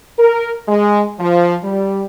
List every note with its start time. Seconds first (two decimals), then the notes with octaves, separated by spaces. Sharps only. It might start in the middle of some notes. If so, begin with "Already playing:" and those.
0.19 A#4
0.68 G#3
1.20 F3
1.64 G3